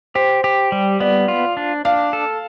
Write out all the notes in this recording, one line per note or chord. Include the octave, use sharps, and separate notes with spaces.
G4 C5
G4
G3
B3 D5
F4
D4
D4 F5
A4